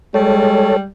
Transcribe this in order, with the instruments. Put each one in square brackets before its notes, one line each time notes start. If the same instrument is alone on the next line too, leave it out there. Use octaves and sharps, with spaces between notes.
[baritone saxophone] G3 [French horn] G#3 [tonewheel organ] A4 C#5